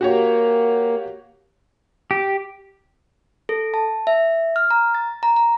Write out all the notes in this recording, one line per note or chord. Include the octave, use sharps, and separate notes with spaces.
A#3 F#4 G4 C#5
G4
A4
A5
E5
F6
A#5
A6
A#5
A#5